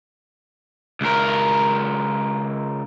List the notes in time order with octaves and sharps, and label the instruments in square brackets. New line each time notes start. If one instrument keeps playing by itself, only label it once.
[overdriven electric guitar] C#2 A#4